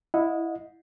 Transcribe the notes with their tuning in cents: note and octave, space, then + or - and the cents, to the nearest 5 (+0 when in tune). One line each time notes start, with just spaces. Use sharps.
E4 +0 D#5 +0 F#5 -35